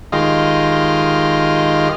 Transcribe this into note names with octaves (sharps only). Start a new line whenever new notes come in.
D#3 G#3 F4 G4 D#5 F5